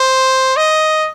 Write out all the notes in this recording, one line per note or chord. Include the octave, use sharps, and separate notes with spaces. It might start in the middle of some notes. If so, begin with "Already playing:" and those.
Already playing: C5
D#5